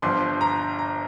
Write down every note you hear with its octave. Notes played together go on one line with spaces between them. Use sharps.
G1 G2 F3 C6
A#5
A#5